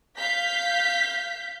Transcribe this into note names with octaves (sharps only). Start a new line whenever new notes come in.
F5 G6 B6